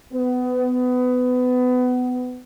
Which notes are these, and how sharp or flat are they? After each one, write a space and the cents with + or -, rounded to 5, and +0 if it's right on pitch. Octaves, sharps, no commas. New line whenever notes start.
B3 +25